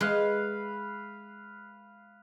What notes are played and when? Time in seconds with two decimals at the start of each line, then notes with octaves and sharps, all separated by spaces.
0.01 G#3 B4 F5